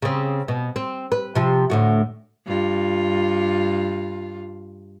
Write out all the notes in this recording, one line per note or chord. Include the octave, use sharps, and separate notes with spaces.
C#3 C4
B2
C4
B4
C3 F3
D2 A2 F#4
G2 F4